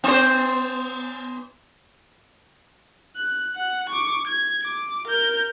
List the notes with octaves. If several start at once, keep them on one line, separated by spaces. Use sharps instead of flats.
B3 C5
F#6
F#5
C#6 D6
G#6
D6
A#4 G6